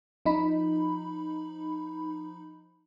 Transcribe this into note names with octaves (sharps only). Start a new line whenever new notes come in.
F3 D#4 B5